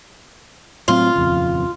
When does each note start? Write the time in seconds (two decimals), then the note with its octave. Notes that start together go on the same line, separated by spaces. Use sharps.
0.88 A2 F#3 C4 F4
1.15 D#1 F2 C#3